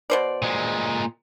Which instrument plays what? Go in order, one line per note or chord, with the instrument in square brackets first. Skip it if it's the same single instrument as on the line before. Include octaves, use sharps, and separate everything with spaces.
[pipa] B2 C5 D5
[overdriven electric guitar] A#2 G#3